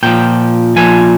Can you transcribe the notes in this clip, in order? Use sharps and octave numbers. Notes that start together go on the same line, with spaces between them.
A#2 F3 G5
A#2 F3 G#5